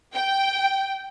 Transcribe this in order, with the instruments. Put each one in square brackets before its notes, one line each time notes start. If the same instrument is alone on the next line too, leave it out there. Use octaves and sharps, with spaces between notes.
[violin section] G5